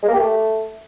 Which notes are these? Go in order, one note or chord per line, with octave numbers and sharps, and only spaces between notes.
G#3
A#3
G4
A3